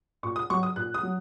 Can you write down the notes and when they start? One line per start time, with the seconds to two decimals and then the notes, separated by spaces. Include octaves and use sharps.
0.23 A#2 C#6
0.36 D#6
0.50 F#3 C#6
0.63 D#6
0.76 A#2 F#6
0.94 D#6
1.03 F#3